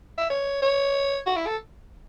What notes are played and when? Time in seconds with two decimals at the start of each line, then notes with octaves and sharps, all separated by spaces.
0.18 E5
0.30 C#5
0.62 C#5
1.26 F#4
1.36 E4
1.47 A4